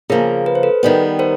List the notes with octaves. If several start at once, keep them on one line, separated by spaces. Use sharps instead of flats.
C#3 F3 A#3 G#4 A#4
B4
C5
A4 B4
D#3 G3 B3
A#4 C5